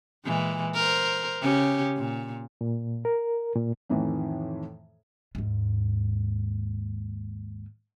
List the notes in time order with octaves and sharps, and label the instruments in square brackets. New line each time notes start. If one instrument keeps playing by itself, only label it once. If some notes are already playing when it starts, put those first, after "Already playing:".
[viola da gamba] A#2 E3 G#3
A#4 C5
C#3 C#4 G4
A#2
[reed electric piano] A#2
A#4
A#2
[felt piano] F2 A2 D#3 E3
[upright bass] D#2 G#2